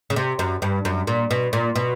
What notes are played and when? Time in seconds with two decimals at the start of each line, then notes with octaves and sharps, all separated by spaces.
0.10 C#3
0.16 C3
0.39 F#2
0.62 G2
0.85 F#2
1.07 A#2
1.31 B2
1.53 A#2
1.76 B2